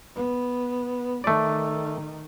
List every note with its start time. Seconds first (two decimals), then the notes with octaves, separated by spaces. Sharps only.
0.16 B3
1.24 D#3 A3 D5